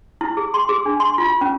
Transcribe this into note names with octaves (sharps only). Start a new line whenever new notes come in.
E4
G#4
C6
G#4
D4
C6
F4
C#4